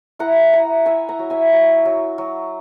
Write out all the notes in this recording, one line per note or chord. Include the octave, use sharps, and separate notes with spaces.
E4 F#5 A#5
E4 F#5 A#5
E4 E5 G#5
F#5 A#5
F#3
E5 G#5
F#3
F#3
F#3